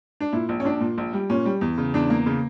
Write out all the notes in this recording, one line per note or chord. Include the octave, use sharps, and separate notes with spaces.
D4
A#2 E4
A#1
C#4
A#1 D4
A#2
A#1
G3
A#2 C#4
G3
E2
C#3
E2 D4
A#3
C#3